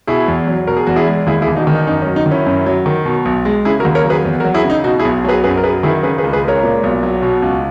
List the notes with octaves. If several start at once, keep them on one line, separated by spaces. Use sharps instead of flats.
B2 E4 G#4
E2
F#3
B2 A#4
G#4
E2 F#4
E4 G#4
G#3
D#2 E4 G#4
E4 G#4
E1
D#4 F#4
D#3 D#4
F#2 D#4
C#4
F#3
D#4
D#3
C#4 E4
F#2
F#3
D#3
B2
B1
G#3
C#3 E4 G#4
F#4 A#4
D#2
A#4 C#5
F#3
G#4 B4
E2
F#4 A#4
F#3
E4 G#4
C#3
D#4
B2 D#4 F#4
E4 G#4
B1
F#3 G#4 B4
F#2 G#4 B4
A#4
F#3 G#4 B4
D#3 E4 G#4
C#3 G#4 B4
G#4 B4
C#2
G#4 B4
G#3
A#4 C#5
A#2
B1
F#3
B2
C#2